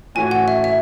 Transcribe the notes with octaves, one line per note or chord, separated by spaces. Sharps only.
A2 E3 A3 C#4 F#4 G#5
F#5
E5
E5